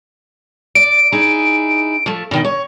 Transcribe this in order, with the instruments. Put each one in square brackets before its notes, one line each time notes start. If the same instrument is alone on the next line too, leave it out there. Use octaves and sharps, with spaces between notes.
[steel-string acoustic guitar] D5 [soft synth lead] D7
[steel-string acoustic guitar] D#4 E4 G#4
F3 A3
B2 D#3 G5
C#5